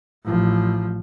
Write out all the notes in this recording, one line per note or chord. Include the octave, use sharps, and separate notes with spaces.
A1 F3